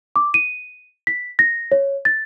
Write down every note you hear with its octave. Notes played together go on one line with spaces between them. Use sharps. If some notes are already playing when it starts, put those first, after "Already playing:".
D6
D#7
B6
A#6
C#5
A6